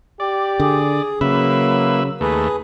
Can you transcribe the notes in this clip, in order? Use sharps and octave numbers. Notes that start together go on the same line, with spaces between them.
G4 D5
D3 G#4
C#3 F#3 A#3 B4 E5
D#2 A3 G#4 B4